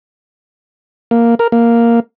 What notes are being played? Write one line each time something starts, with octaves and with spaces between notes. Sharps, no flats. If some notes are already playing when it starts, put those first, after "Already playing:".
A#3
A#4
A#3